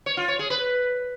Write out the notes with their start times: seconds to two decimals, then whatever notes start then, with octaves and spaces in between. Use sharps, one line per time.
0.06 C#5
0.17 F4
0.28 C#5
0.39 G#4
0.50 B4